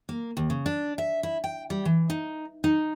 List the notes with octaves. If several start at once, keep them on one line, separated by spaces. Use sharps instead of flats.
A#3
D#2
C#3
D4
E5
E4
G5
G3
E3
D#4
D#4